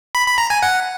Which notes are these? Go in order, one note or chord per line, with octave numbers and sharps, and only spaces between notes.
B5
B5
A#5
G#5
F#5